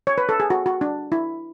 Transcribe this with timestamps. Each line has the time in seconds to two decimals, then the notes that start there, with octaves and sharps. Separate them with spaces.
0.07 C#5
0.18 B4
0.29 A4
0.40 G#4
0.50 F#4
0.66 F#4
0.81 D4
1.12 E4